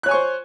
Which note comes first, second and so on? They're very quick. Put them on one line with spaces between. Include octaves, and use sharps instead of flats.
F#6 C#5 G#5 C#6 C5